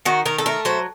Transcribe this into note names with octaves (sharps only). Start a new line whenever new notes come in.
D#3 F#4
D#3 A#4
A4
A3 A#4
F#3 C5